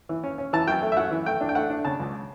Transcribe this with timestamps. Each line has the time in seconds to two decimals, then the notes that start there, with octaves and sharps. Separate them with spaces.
0.09 E3
0.24 C#4
0.38 C#4
0.53 E3 A5
0.67 F#2 G5
0.82 A3
0.92 E5
0.97 F#2 F#5
1.11 E3
1.26 A3 G5
1.41 D4
1.49 G5
1.55 A3 F#5
1.70 D4
1.85 C#3 A5
2.00 C#2